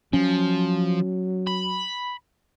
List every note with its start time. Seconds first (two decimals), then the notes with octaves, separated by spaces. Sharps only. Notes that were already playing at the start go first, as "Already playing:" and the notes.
0.13 F3 F#3 C#4
1.47 B5